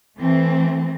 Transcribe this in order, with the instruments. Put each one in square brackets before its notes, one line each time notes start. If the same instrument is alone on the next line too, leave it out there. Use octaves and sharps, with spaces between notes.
[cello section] E3 A3 C4